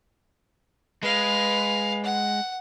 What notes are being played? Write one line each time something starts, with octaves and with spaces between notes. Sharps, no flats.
G#3 B4 F5
F#5